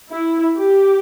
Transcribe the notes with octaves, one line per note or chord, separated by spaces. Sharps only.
E4
G4